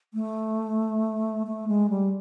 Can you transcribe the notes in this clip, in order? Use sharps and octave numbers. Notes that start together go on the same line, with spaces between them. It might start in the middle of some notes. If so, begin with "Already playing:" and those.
A3
A3
G#3
G3